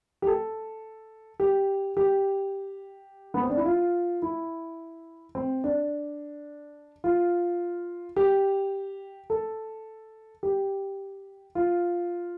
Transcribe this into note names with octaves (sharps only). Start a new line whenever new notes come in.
G4
A4
G4
G4
B3
C4
D4
E4
F4
E4
C4
D4
F4
G4
A4
G4
F4